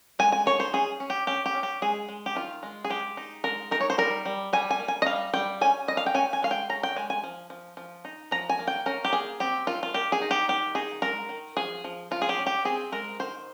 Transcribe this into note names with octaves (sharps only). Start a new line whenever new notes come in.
G#3 G#5
G#5
D#4 C#5
C5
C#4 G#4
C#4
G4
C#4 G4
G4
C#4
G4
G#3 G#4
G#3
G4
D#3 F4
G#3
G#4
G#3 G4
D#4
G#3 A#4
D#4 A#4
C#5
C5
G3 A#4
G3
G3 G#5
G#5
A#3
G#5
D#5
G3 F5
G3 G5
C#4 G#5
G3 D#5
F5
G5
C#4 G#5
G#5
G#3 F5
G5
C#4 A#5
G5
G#3 G#5
G#5
F3
F3
F3
D#4
F3 A#5
G#5
A#3
G5
C#4 A#4
G4
A#3 G#4
C4 G4
D#3 F4
F4
D#3 G4
G#4
D#4
G4
D#3 G4
D#4 G#4
G#3 A#4
D#3
F3 G#4
F3
F3 F4
G#4
G4
C#4
G4
C4 G#4
G#3 A#4
D#3 C5